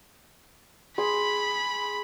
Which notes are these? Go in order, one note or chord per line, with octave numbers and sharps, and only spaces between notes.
G#4 B5 C6